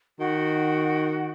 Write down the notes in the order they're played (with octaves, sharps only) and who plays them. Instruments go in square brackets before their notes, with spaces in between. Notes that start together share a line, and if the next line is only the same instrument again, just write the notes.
[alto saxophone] D#3 [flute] F#4